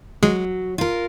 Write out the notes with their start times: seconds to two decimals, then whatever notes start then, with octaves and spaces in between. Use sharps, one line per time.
0.23 F#3 G#3
0.78 F4 A#4